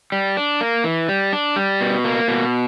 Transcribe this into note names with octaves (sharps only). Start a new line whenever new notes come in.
G3
D4
A#3
E3
G3
D4
G3
B2
A#3
B2